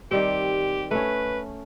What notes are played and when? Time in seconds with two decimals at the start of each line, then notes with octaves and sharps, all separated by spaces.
0.11 D#3 G3 C4 G4
0.91 A3 C#4 B4